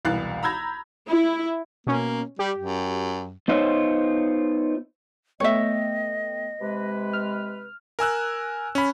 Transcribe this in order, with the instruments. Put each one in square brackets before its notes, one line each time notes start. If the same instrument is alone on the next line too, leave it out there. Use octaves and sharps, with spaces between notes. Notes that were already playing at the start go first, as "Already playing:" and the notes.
[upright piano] E1 C2 E3 F5 F#6 A6
A#5 B5 E6 G6 G#6 A#6
[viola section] E4
[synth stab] B2 C#4 [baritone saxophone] A#3
[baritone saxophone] G3 [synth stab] G4
[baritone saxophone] F#2
[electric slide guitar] B3 D#4 F4 C5 C#5 E5
[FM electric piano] A3 B3 G5 [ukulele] C#5 E5 [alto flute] D#5
[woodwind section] C3 G#3 B4
[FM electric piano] F6
[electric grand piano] A#4 G#5 E6 F#6
C#4 B5